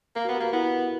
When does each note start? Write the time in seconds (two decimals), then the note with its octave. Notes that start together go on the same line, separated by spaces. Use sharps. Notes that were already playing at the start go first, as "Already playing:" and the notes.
0.15 A#3 A#4
0.25 B3 F#4
0.35 G4
0.40 A#3 F#4
0.53 B3 E4